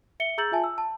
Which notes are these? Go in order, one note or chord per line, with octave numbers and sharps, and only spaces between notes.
E5 C#7 G7
G#4 A#5 E6 G6 A6 F#7
F4 E5 G#5 A5
E6
A5